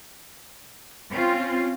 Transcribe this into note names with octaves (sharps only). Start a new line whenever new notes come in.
C4 C#4 F4